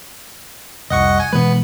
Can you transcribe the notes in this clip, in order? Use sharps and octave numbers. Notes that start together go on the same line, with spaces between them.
F1 C2 D#5 F#5 C#6
G#5
B2 E3 G#3 B3 B4